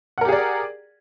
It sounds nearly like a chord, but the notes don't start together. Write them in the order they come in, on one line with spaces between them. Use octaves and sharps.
F#5 A#4 G4 G#4 D5